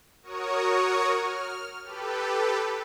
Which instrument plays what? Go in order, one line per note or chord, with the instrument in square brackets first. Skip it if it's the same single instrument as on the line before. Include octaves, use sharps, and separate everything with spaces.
[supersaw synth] F#4 A#4 C#5 C#6 D#6
F6
G4 A4 B4